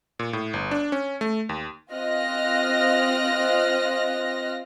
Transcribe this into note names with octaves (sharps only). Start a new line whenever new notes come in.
A#2
A2
G1
D4
C#4
A3
D#2
C4 F4 D#5 F6 F#6 A#6